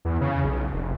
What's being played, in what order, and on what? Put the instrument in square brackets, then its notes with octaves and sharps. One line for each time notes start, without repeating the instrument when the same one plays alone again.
[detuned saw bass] E2
C#3
B1
F1